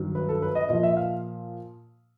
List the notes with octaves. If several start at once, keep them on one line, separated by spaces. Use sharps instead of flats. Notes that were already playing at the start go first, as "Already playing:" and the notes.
Already playing: G2 D#3 F#3
B4
A4
B4
D#5
A#2 F3 D#5
E5
F5